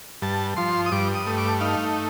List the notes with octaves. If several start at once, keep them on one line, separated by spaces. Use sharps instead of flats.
G2 A5
F3 C6
D#6
G2 D6
D#6
A3
D6
D#4 F5